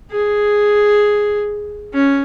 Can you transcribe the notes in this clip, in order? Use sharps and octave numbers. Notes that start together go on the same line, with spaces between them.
G#4
C#4